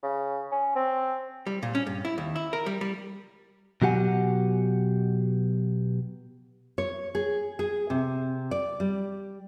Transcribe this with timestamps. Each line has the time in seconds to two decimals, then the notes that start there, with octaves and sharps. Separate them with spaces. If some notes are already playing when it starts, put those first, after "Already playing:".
0.03 C#3
0.52 C#4
0.75 C4
1.47 G3
1.63 A#2
1.75 C#4
1.87 G2
2.05 E4
2.18 D#2
2.36 E4
2.53 A#4
2.66 G3
2.81 G3
3.82 B2 F#3 G4 F#5 G#5
6.78 C#5
7.15 G#4
7.59 G#4
7.90 C3
8.51 D5
8.80 G3